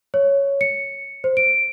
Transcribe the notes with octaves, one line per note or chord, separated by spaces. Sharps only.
C#5
C#7
C5
D7